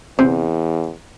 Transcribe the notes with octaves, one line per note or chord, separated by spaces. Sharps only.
E2 C3